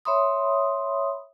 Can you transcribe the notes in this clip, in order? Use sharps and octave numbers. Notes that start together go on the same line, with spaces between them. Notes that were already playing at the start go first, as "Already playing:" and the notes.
C#5 E5 B5 C6 D#6